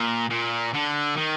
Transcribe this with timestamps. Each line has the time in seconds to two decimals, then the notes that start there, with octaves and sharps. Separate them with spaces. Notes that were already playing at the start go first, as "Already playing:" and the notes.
Already playing: A#2
0.30 A#2
0.74 D3
1.17 D#3